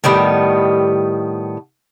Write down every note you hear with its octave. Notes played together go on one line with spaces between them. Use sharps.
A2 D#3 G3 B3